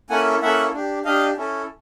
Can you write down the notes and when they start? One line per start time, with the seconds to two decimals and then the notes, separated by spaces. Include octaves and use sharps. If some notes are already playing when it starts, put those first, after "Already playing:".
0.10 A#3 C#4 E4 A4 F#5 G#5
0.42 A#3 C#4 E4 A4 E5 F#5
0.74 D4 G4
1.05 D4 G4 D#5 F5
1.37 C#4 E4 A4